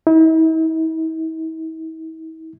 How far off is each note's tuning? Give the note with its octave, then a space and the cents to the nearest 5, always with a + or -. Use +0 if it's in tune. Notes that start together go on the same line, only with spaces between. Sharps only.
E4 -45